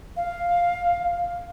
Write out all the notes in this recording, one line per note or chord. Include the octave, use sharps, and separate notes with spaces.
F5